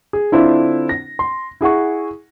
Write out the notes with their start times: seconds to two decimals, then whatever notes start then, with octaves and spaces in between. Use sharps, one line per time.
0.13 G#4
0.32 D3 C4 D4 E4 F4 C5
0.89 A#6
1.19 C6
1.61 E4 G#4 F#5 C#6